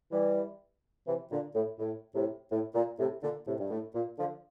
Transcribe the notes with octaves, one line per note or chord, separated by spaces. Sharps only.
E3 G3
C3 E3
A#2 D3
A2
A2
A2 C3
A2
A#2
A2 C3
A#2 D3
A2 C3
G2
A2
A#2
D3 F3